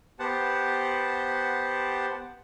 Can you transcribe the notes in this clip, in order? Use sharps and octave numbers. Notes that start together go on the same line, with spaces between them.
B3 G4 C5 F#5 A5